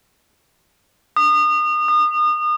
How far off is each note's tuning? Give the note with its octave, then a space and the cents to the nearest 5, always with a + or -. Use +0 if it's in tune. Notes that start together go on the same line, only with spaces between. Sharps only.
D#6 -30
D#6 -35